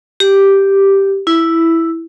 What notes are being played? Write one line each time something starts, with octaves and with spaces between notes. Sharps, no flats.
G4
E4